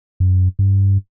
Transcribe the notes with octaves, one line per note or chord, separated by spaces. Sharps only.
F#2
G2